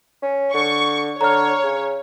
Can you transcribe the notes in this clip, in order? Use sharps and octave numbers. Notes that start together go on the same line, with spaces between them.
C#4
D3 C#6
D3 C#5 A#5 F6
C#3